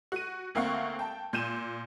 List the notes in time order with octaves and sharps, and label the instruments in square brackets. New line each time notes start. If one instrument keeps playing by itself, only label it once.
[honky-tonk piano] F#4 D#7
D2 A#3 C4 F5 F#5 C#6
G5 A5
A#2 G6 D#7 E7